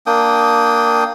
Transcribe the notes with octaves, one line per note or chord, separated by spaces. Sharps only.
A#3 D4 G5 D#6